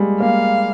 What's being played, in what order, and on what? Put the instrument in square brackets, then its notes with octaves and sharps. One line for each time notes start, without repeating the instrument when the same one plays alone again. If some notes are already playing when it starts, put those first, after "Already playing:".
Already playing: [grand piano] G3 G#3 A#3
[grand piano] A#3 [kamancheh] F5